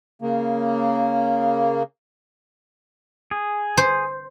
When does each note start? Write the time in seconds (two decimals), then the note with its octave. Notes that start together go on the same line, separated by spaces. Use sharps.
0.22 C#3 A#3
3.31 G#4
3.77 C5